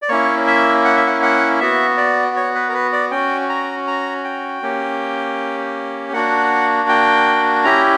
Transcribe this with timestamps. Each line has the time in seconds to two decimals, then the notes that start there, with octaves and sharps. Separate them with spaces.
0.02 D5
0.09 A#3 C#4 E4 C#5
0.47 E5
0.85 F#5
0.96 E5
1.07 F#5
1.22 F#5
1.60 B3 F#4 E5
1.97 D5
2.36 C#5
2.55 B4
2.69 A#4
2.74 B4
2.92 D5
3.11 C#4 F#4 G5
3.49 A#5
3.87 A#5
4.24 G5
4.62 A#3 C#4 G4
6.13 A#3 D4 F#4 F#5
6.89 G5
7.64 C#4 E4 G4 A#5